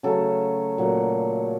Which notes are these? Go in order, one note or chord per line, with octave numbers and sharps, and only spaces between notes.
C#3 F#3 A3 A4
A#2 F#3 A3